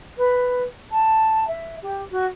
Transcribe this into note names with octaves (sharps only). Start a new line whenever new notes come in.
B4
A5
E5
G4
F#4